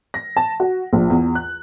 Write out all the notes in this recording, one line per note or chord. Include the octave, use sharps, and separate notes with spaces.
A#6
A5
F#4
A#1
E2
F#6